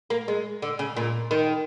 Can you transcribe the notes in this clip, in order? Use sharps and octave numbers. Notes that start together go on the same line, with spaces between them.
A#3
G#3
D3
C#3
A#2
D#3